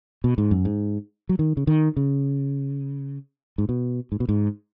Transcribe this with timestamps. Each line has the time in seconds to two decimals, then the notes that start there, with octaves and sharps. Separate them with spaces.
0.24 B2
0.38 G#2
0.51 F#2
0.65 G#2
1.29 F#3
1.39 D#3
1.57 C#3
1.67 D#3
1.97 C#3
3.58 G#2
3.69 B2
4.12 G#2
4.20 B2
4.29 G#2